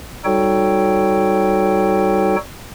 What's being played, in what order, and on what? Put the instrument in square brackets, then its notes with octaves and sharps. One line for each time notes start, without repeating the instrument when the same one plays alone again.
[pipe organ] G3 D#4 F#4 A4 C#5 G5